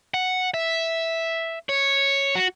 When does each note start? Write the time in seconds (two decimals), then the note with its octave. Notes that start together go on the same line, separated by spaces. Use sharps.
0.14 F#5
0.54 E5
1.69 C#5
2.35 F#4